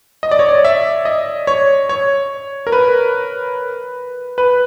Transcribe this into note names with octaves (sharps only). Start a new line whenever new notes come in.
D#5
D5
C#5
D5
E5
D#5
C#5
C#5
A#4
B4
B4